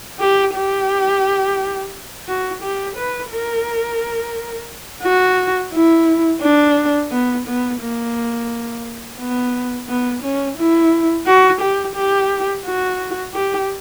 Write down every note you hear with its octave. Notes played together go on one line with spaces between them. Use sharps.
G4
G4
F#4
G4
B4
A#4
F#4
E4
D4
B3
B3
A#3
B3
B3
C#4
E4
F#4
G4
G4
F#4
G4